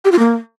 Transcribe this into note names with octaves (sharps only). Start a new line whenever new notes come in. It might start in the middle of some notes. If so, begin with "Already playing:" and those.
G4
F4
A#3